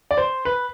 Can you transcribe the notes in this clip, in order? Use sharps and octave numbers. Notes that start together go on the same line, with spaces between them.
D5
C5
B4